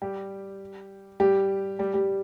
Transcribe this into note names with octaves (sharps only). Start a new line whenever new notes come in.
G3 G4
G3 G4
G3 G4
G3 G4